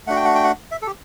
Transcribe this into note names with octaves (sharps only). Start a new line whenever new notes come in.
A3 D4 F#4 F#5
G5
F#5
G5
F#5
E5
A4
G4